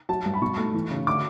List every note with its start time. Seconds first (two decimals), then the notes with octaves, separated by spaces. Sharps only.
0.09 F#3 A5
0.26 G2
0.34 B5
0.42 B2 C#6
0.58 A3
0.74 E3
0.91 C#3
1.07 D3 D6